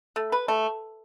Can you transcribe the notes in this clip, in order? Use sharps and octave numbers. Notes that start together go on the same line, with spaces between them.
A3
B4
A3